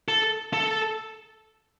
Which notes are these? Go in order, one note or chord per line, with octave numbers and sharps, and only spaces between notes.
A4
A4